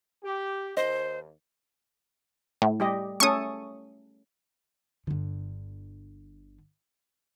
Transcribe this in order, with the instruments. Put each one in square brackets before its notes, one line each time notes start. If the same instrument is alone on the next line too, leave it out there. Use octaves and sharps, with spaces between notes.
[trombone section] G4
[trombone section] D#2 [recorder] C5 [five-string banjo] D#5
[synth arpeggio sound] A2
[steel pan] G3 G4 D#5
[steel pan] A3 C#4 A4 [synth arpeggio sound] C#6 D#6
[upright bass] G1 D3